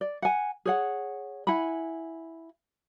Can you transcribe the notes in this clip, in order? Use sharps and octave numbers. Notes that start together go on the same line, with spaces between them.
D5
F#5 G#5
G#4 C#5 F#5
E4 F#5 G#5 B5